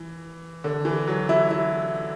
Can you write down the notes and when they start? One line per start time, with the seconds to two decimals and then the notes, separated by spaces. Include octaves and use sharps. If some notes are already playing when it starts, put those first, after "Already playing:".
Already playing: E3
0.64 D3
0.85 E3
1.08 F#3
1.29 E4
1.51 E4